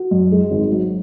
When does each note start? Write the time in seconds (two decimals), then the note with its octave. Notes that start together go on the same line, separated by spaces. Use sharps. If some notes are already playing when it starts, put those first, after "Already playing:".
Already playing: F#4
0.11 F#2
0.32 G#3
0.51 G#1
0.72 F#3